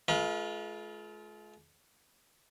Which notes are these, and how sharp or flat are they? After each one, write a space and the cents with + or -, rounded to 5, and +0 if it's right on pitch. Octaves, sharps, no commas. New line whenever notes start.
G#3 +45 F4 +0 B4 -45